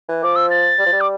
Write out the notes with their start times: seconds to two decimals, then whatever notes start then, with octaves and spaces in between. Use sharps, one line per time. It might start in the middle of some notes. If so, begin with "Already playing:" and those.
0.09 E3
0.23 F3 D6
0.36 E6
0.50 A6
0.78 G3
0.86 F3
0.92 G3
1.01 D6